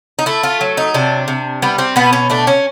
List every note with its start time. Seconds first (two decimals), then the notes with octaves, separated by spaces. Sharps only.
0.19 D#4
0.26 A3 E4
0.43 F4
0.61 F#3
0.77 D#4
0.94 C3 D4
1.28 C3
1.62 G3 B3
1.78 C4
1.96 B2 B3
2.13 C#4
2.30 A3 D4
2.47 C#4